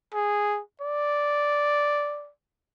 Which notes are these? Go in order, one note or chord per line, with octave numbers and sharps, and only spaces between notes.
G#4
D5